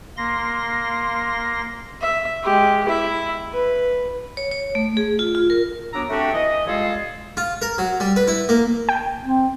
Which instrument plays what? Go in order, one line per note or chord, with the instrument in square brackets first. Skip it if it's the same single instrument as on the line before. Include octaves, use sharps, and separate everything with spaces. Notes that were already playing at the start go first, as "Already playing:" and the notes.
[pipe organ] A#3 C6 A#6
[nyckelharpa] E5
G#3 G4
E4 E5
B4
[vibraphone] C#5
C#5
A3
G#4
F4
F4
A#4
[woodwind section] F#3 B3 D4 A#5 D6 E6
A3 C4 D4 F#4 G4 A4
E3 D#5
G3 G#3 F4 G#4 A4 F5
[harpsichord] F4
A#4
F#3
G3
B4
E4
A#3
[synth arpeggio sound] G5
[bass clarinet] C4